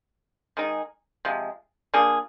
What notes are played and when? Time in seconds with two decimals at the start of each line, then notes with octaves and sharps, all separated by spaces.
0.57 D#3 G#3 D#4 G#4
1.25 C3 F3 G#3
1.94 F3 A#3 D4 G#4